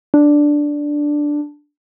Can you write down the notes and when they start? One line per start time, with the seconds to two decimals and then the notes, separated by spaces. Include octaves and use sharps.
0.14 D4